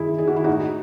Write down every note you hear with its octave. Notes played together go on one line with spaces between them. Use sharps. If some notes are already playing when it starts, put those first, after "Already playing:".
Already playing: F#2 D#3 E4 G#4
D#3 G#4
F#4
E4
A2 D#4 F#4